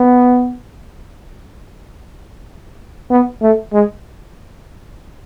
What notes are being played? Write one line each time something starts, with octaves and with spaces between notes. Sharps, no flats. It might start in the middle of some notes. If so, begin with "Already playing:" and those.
Already playing: B3
B3
A3
G#3